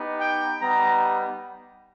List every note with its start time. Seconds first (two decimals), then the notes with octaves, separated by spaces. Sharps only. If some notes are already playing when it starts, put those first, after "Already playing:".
Already playing: B3 D#4 G4
0.21 G5
0.61 G3 B3 D#4 A#5